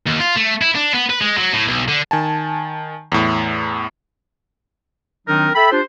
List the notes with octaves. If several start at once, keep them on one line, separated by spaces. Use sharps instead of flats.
D#2
F4
A3
E4
D4
B3
B4
G#3
F#3
A2
B1
D3
D#3 G#5 A5
E2 A2
D#3 F#3 C4 D4 D#4 A#4
A4 E5 G5 B5
D4 F4 G4 C5